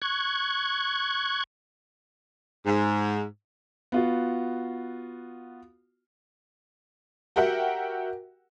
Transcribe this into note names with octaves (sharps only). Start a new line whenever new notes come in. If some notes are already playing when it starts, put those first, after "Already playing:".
C#6 F#6 G#6
G#2
B3 F4 F#4
F#4 G4 A#4 E5 F#5 G5